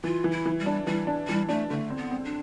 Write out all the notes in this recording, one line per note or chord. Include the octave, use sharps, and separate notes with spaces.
E3 F4
E3
E4
E3
G3
D4
E3 G3
D4
E3 G3
A3 D4
D3 A3
C4
B3
C4
D4